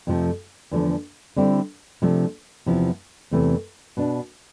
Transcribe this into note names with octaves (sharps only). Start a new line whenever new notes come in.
F2 C3 F3 A3
E2 D3 F3 A3
D3 G3 C4 E4
C3 F3 A3 D4
E2 C3 F3 B3 E4
E2 C3 E3 A3 C4
B2 B3 D4